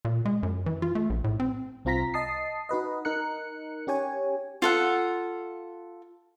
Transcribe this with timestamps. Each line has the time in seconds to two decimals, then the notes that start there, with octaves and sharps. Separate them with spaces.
0.05 A#2
0.25 G#3
0.43 F#2
0.66 E3
0.82 F4
0.95 A3
1.10 A#1
1.24 A2
1.40 C4
1.85 C2 C4 F4 A#5 A#6 B6
2.14 D#5 A5 D#6 C7
2.69 D#4 F#4 B4 D#5
3.05 D#4 A#4 F#6 C#7
3.87 C#4 G4 C#5 G#5
4.62 F4 A4 F#5